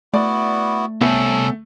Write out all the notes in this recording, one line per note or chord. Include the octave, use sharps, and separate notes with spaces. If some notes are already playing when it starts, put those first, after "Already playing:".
A3 B3 E4 F#4 D5
C2 A3 B3 C#4 A4